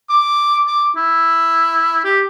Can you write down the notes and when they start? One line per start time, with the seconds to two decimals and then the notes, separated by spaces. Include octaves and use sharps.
0.09 D6
0.67 D6
0.96 E4
2.04 G4